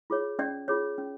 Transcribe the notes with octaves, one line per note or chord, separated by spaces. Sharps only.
F4 G#4 C#5
C#4 D5
F4 G#4 C#5
C#4